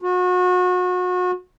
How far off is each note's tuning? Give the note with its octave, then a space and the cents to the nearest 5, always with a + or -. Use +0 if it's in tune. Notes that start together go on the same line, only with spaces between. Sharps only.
F#4 -30